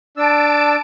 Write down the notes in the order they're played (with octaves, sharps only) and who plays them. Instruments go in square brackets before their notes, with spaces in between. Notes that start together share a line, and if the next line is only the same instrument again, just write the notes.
[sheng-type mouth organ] D4 E6 [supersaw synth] A5 D7